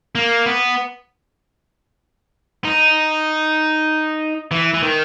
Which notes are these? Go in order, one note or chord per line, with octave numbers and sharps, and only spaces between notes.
A#3
B3
D#4
E3
E3
D#3